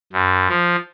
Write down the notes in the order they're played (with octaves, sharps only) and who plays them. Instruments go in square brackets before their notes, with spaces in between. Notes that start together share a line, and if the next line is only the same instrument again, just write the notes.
[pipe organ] F#2
F3